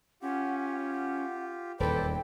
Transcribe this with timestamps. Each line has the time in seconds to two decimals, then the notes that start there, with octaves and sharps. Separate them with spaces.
0.22 C#4 F4 G4 F#5
0.90 F#5
1.80 D#1 E2 A4 B4 C5 D5 G5